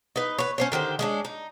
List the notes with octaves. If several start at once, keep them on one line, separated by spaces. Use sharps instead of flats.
D#4 B4
B4 C#5
C#4 C5 C#5
D3 D#3 G4 C5
G#3 C#4 D4
D#4